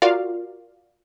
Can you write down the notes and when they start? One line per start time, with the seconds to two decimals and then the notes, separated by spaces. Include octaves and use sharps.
0.02 F4 F#4 A#4 D5 F5